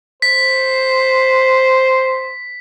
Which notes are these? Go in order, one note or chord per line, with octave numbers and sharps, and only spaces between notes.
C5 B6